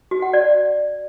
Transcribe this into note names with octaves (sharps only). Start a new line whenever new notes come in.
F#4
F#5
D5